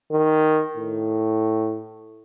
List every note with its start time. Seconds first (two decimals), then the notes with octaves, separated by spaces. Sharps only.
0.11 D#3
0.76 A2